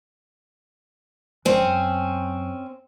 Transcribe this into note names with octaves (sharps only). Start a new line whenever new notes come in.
G1 F3 G#3 C4 C#4
F#2